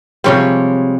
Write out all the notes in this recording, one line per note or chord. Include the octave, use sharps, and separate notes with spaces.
C3 F3 G3 G#3 C4 C#5